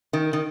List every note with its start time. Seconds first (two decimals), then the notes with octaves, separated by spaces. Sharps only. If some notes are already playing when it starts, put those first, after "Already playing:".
0.13 D#3
0.33 D#3